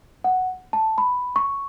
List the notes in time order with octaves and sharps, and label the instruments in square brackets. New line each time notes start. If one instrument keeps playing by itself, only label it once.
[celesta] F#5
A5
B5
C#6